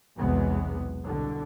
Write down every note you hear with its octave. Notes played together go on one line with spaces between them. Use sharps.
B1 E2 C3 G#3 B3
C2 B2 D3